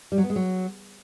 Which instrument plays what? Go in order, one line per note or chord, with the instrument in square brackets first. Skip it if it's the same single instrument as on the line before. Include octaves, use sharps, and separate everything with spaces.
[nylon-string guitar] G3
F#3
B3
G#3
F#3